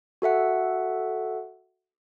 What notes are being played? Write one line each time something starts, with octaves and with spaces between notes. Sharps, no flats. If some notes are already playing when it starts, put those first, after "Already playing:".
F#4 A4 E5 F#5